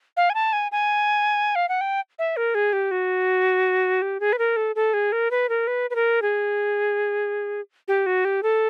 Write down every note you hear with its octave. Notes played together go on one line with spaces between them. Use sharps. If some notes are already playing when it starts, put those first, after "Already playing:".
F5
G#5
A5
G#5
G#5
F5
F#5
G5
E5
A#4
G#4
G4
F#4
G4
G#4
B4
A#4
A4
A4
G#4
A#4
B4
A#4
B4
B4
A#4
G#4
G4
F#4
G4
A4